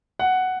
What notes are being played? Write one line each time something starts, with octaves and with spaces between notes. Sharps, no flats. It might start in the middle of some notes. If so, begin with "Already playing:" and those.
F#5